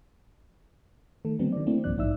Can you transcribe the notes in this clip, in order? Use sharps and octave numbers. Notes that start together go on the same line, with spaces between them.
D#3 A3 A4
D3 F#3 A3 B3 C4 D4
D#3 D5
A3 A#3 C4 D4 E4
C2 G2 F3 D5 F#6
A#1 G#2 D#4 D5 E5 E6